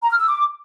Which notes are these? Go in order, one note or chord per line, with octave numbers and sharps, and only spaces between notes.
A#5
F6
E6
D6